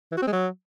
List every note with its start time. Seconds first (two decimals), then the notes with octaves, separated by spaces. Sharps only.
0.12 E3
0.17 F#4
0.22 C4
0.27 G#3
0.33 F#3